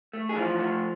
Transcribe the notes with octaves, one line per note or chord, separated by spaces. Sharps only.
A3
G#4
E3 F3 F4
A3